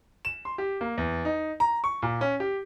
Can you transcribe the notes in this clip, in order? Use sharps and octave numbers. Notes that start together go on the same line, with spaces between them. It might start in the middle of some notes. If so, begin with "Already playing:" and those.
E7
C6
G4
A#3
E2
D#4
A#5
C#6
A#2
C#4
G4